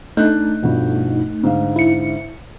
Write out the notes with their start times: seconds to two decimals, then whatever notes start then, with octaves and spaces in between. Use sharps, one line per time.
0.17 A3 D4 D#4 F#6 G6
0.62 G2 B2 F3
1.43 G#2 D3 F5
1.76 E4 C#7